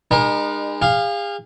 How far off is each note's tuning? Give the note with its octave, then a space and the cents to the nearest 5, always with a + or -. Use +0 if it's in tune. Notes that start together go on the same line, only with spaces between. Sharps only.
G#3 -35 D#4 -45 A#4 +30
G#4 -40 F5 +0